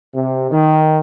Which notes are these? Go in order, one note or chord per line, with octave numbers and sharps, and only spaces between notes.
C3
D#3